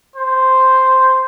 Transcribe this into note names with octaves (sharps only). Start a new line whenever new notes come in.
C5